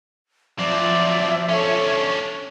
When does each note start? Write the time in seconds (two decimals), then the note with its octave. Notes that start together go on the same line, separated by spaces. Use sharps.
0.59 F3 F#3 C4 D5 E5
1.49 C#4 D4 A4 C#5